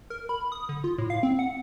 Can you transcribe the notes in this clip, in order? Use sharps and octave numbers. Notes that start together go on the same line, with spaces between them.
A#4
B5
D#6
D3
F4
A2
F5
C4
F#5